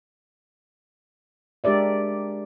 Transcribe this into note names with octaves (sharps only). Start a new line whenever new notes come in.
G#3 D4 G4 A#4 D5 E5